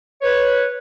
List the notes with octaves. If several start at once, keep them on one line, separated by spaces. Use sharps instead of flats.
B4 C#5